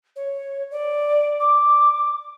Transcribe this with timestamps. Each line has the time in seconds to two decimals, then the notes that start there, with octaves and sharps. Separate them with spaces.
0.16 C#5
0.71 D5
1.40 D6